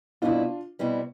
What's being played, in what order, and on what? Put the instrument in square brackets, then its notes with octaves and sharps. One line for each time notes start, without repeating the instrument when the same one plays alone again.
[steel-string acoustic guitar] B2 G3 C4 E4 [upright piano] D4 F4
[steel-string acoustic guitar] B2 G3 C4 E4